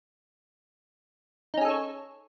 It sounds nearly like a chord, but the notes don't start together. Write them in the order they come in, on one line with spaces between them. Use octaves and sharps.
D#4 C#4 G#4 A4 C#5